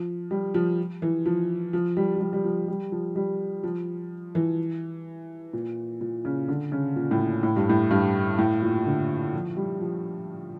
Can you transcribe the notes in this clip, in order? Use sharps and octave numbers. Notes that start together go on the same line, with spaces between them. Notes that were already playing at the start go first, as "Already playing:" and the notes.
Already playing: F3
G3
F3
E3
F3
F3
G3
F3
G3
G3
F3
G3
F3
G3
F3
E3
A#2
A#2
C#3
D3
C#3
A#2
A2
A#2
A2
G2
A2
G2
A2
A#2
D3
F3
G3
F3